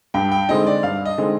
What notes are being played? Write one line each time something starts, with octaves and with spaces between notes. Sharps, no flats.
G2 G5
G5
D3 G#3 C4 D#4 D#5
D5
G2 F5
D#5
D3 G#3 C4 D#4